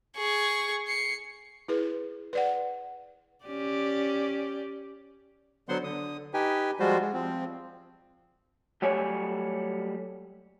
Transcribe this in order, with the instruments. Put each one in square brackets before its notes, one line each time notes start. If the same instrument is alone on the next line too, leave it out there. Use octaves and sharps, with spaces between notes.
[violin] G#4 C#6
C7 C#7
[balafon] E4 G#4 B4
B4 D5 F#5
[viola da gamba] C#4 G4 D5
[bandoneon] D3 F#3 B3 C5 F#5 C6
D3 D#6
D#4 G4 B4 G5 G#5
F3 G3 G#3 F4 F#4 C5
G#3
F3 C4
[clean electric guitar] F#3 G3 A3 G4 C#5 G#5